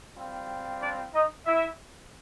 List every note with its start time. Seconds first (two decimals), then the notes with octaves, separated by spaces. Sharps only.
0.16 G3 C4 F4
0.81 D4 D5
1.14 D#4 D#5
1.46 E4 E5